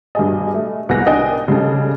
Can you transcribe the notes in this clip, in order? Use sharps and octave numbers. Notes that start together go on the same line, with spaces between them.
G2 B2 G#4 D#5
A3
C2 B3 G#4 F#6 A#6
D4 D#4 A#4 D#5 G5 G#5
C#3 G3 A4